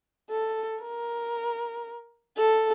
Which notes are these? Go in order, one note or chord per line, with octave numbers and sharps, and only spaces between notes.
A4
A#4
A4